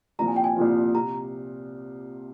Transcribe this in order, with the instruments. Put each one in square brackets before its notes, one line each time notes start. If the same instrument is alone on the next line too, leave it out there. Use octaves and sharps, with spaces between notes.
[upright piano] C2 A#2 F3 [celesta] A#5
[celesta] G#5
G5
G#5
[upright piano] C2 A#2 F3
[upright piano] C3 [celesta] A#5